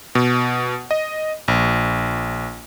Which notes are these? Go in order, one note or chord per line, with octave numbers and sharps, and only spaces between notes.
B2
D#5
A#1